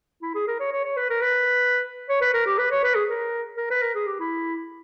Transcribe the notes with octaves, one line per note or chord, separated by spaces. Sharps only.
E4
G#4
A#4
C#5
C#5
C#5
B4
A#4
B4
C#5
B4
A#4
G4
B4
C#5
B4
G#4
A#4
A#4
B4
A#4
G#4
G4
E4